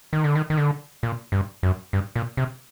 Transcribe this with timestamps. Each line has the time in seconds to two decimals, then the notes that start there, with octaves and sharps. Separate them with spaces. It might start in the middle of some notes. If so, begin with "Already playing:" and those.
0.13 D#3
0.24 D3
0.35 D#3
0.50 D#3
0.57 D3
1.03 A#2
1.32 G2
1.63 F#2
1.93 G2
2.16 A#2
2.37 C3